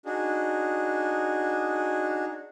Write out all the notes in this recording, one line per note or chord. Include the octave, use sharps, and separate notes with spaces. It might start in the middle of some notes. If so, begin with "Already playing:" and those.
D4 D#4 F#4 G#4